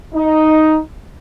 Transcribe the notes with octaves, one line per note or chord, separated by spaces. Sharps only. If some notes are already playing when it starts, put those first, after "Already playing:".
D#4